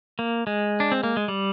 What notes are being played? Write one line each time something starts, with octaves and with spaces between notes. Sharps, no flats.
A#3
G#3
D4
C4
A#3
G#3
G3